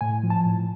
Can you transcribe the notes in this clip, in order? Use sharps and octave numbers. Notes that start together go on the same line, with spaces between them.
A2 G#5
F3
A5
A2